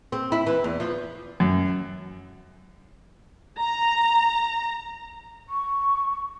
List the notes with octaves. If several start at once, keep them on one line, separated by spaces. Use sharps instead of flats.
C4
E4
E3
E2
F3
F#2
A#5
C#6